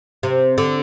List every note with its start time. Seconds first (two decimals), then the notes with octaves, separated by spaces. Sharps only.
0.23 C3
0.58 D3